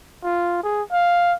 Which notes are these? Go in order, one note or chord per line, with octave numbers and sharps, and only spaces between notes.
F4
G#4
F5